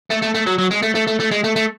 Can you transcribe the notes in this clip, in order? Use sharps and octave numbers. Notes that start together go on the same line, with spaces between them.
A3
A3
A3
F#3
F#3
G#3
A3
A3
A3
A3
G#3
A3
A3